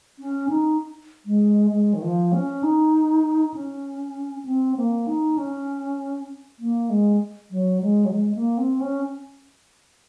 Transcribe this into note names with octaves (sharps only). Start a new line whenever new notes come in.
C#4
D#4
G#3
G#3
D#3
F3
C#4
D#4
C#4
C4
A#3
D#4
C#4
A#3
G#3
F#3
G#3
F#3
G#3
A#3
C4
C#4